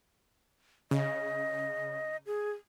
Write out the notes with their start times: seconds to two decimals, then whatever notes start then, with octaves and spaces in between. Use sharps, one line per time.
0.91 C#3 D#5
2.26 G#4